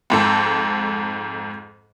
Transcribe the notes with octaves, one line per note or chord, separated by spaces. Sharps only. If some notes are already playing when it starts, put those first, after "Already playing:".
F2 G#2 A4